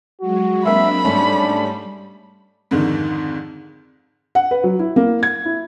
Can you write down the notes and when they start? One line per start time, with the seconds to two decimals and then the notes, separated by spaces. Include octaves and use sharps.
0.21 F#3 G#3 F#4
0.65 F#3 G#3 A#3 C4 D4 E5 B5
1.05 G#2 G3 A3 C#4 D4
2.71 F2 G#2 D3 D#3
4.35 F#5
4.51 B4
4.64 F#3
4.79 E4
4.96 A#3
5.23 G#6
5.45 E4